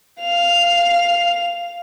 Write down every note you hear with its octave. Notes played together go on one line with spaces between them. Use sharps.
F5 F7